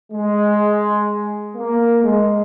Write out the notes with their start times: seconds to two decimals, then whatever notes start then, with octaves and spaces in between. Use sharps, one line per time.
0.12 G#3
1.56 A#3
2.04 G#3